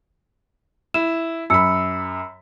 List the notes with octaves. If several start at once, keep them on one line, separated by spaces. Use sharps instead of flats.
E4 E7
F#2 B5 E6 C#7